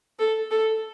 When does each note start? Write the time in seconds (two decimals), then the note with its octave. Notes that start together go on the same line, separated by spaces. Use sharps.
0.19 A4
0.51 A4